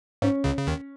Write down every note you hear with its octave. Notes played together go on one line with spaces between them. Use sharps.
G#2 C#4
C#2 C#3
C#3
D#2 D#3